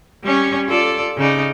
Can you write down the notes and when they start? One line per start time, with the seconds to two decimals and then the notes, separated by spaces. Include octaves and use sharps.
0.23 G3 C#4 C#5
0.68 F4 A4 D5
1.18 C#3 D#4 D5